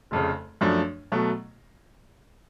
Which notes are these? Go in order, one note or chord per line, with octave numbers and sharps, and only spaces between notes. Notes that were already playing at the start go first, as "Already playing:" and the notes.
F1 F2 C#3
F#2 F3 A3 D4
B2 F#3 A3